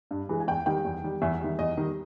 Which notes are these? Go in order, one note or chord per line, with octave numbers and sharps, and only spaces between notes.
G2
E3 G#3
G#5
E2 G5
D#3 G3 G5
E2
D#3 G3
E2 E5
D#3 G3
E2 D#5
D#3 G3